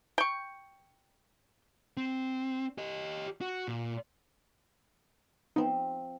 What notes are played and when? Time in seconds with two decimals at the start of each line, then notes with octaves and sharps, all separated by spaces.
0.18 G5 C#6
1.97 C4
2.78 G4 D#5
3.41 F#4
3.68 A#2
5.56 F3 B3 C4 D#4